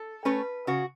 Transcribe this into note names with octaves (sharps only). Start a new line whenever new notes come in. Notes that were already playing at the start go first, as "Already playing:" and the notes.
Already playing: A4
A3 C#4 B4
C#3 F#4